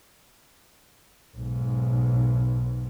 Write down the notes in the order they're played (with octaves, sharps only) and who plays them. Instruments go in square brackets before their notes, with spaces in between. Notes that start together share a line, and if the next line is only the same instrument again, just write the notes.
[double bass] B1 G#2